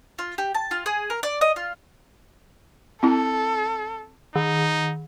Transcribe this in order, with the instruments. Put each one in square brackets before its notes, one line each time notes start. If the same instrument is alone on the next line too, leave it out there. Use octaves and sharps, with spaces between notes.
[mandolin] F4
G4
A5
F4
G#4
A#4
D5
D#5
F4
[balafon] C4 E4 [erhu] A4
[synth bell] D#3 [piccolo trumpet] D#4